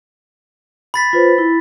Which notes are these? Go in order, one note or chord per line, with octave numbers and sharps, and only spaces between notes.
B5 A6 B6
F4 B4 C5
E4